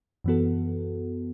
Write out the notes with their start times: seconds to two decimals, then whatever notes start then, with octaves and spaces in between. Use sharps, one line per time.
0.24 F#2 E3 B3 F#4 A4